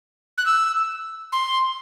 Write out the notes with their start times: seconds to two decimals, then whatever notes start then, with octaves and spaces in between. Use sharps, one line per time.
0.38 F#6
0.46 E6
1.32 C6